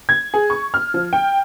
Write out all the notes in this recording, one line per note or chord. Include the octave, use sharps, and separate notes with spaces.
G#6
G#4
C#6
F6
F3
G5